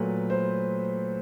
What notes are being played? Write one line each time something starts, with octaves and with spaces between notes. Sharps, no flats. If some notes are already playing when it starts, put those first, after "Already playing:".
Already playing: A#2 F#3 A3 B4
C5